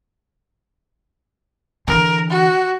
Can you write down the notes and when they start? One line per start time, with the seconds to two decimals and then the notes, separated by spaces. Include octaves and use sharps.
1.88 D3 E3 A#4
2.30 F#4